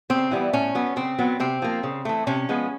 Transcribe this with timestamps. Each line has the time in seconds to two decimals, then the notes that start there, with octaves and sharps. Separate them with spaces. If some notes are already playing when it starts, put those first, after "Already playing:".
0.10 C#3 C4
0.31 E3 G3 B3
0.53 A2 C#4
0.75 F#3 B3
0.96 C#3 C4
1.19 F#3 B3
1.40 C3 C4
1.62 F3 A#3
1.83 C#3
2.05 E3 A3
2.27 C3 C#4
2.49 F3 G#3 B3